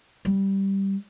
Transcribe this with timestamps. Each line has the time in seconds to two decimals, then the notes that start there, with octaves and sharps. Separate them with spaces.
0.25 G3